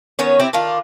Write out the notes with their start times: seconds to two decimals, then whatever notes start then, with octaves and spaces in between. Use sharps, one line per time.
0.19 D#3 B3 C#4 C#5
0.40 C4 E4 G4
0.53 D#3 D4 F4